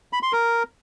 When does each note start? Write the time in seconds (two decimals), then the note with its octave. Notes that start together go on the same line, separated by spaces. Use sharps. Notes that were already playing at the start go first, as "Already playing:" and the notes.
0.13 B5
0.23 C6
0.33 A#4